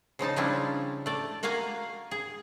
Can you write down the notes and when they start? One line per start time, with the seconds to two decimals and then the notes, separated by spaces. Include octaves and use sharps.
0.19 C#3 F3 D#4 A5
0.36 C#3 F3 G3 C#4 D4 E4
1.06 A3 D5
1.43 A#3 F#4 F5 G#5 A#5
2.11 G#4